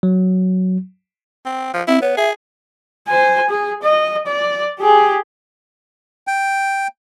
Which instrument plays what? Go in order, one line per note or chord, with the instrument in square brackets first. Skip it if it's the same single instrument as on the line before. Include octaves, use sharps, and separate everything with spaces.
[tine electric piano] F#3
[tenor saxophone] C4
F3
[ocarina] C4 [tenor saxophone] E4
[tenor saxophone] B3 [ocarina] C#5
[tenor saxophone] G#4 [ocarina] E5
[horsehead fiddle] C5 G#5
G#4
D#5
D5
G4 G#4
[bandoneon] G5